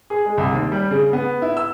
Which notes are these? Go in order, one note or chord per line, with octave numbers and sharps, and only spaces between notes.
G#4
G#3
C2
D#2
G3
C#3
B3
E4
E6